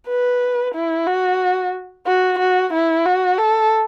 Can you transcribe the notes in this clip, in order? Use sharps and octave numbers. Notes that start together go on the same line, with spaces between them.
B4
E4
F#4
F#4
F#4
E4
F#4
A4